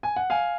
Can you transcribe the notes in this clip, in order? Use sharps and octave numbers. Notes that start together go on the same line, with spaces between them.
G#5
F#5
F5 G#5